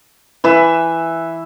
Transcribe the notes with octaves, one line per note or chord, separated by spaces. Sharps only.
E3 B4 E5